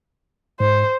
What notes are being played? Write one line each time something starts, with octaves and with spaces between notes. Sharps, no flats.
G#2 C5